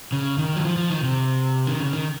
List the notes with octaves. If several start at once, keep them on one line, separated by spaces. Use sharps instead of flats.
C#3
D#3
F#3
F3
F3
D#3
C3
D#3
C#3
D#3